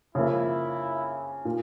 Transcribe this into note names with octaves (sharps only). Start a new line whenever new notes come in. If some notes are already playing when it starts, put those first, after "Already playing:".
C#3 F3 A#3 E4
A#2